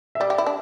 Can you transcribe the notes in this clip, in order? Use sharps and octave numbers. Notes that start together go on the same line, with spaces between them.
E5
G3 D5
G4
E4
D4